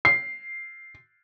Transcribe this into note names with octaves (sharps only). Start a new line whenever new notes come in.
C7